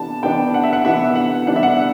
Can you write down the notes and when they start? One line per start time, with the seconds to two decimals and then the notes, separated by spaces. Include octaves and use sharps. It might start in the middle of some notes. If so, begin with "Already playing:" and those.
Already playing: C3 E3 B3 D4 A5
0.23 C3 E3 B3 D4 G5
0.54 F#5
0.64 E5
0.73 F#5
0.84 C3 E3 B3 D4 E5
1.15 F#5
1.47 C3 E3 G3 B3 D4 F#5
1.56 E5
1.63 F#5